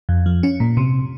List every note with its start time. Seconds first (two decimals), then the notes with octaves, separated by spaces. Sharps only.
0.09 F2
0.26 F3
0.43 C#4
0.60 A#2
0.77 C3